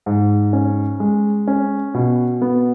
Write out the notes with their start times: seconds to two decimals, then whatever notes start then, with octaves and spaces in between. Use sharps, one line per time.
0.06 G#2
0.53 C#4
1.00 G#3
1.48 C#4
1.94 B2
2.41 B3